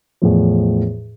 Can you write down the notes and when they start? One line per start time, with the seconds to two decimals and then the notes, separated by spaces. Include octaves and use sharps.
0.22 E2 A2 F3